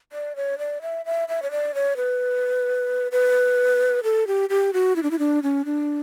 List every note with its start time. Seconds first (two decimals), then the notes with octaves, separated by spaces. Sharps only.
0.12 D5
0.36 C#5
0.58 D5
0.82 E5
1.06 E5
1.29 E5
1.42 C#5
1.51 D5
1.75 C#5
1.97 B4
3.12 B4
4.04 A4
4.27 G4
4.50 G4
4.73 F#4
4.96 E4
5.03 D4
5.11 E4
5.19 D4
5.43 C#4
5.65 D4